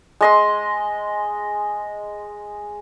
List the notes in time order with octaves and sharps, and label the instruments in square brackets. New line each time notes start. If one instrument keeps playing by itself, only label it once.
[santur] G#3 D#5 C6